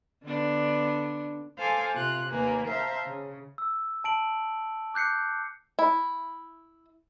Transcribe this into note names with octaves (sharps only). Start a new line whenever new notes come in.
D3 B3 D4
A4 C5 F5 G#5 D6
C3 F4 F#6
D#2 A#3 B4 G#5
C5 E5 F5 A5 A#5
C#3
E6
A5 D7 F#7
D6 F#6 G6 C7 C#7
E4